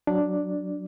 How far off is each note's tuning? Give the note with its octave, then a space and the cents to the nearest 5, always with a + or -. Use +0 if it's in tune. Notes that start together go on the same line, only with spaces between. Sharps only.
F#3 +0 D4 +0 D5 +0